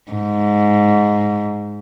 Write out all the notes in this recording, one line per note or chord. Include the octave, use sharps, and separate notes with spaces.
G#2